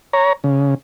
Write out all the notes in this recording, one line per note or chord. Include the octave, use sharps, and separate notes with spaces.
C#5 A#5
C#3